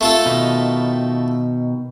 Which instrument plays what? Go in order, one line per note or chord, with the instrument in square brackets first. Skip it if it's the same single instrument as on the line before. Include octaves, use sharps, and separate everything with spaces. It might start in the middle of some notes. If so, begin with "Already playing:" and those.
[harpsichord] A3 F4 A4
[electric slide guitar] B2 D#3